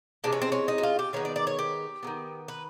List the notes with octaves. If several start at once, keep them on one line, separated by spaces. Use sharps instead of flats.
C3 E3 G#3 D4
C#4
C4
C#4
D#4
F#4
F4
G4
D#3 G#3 B3 C#5
D5
D5
C#5
G4
D#3 F#3 B3
B4